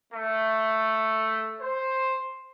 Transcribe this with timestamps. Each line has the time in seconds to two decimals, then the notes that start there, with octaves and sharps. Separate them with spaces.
0.13 A3
1.61 C5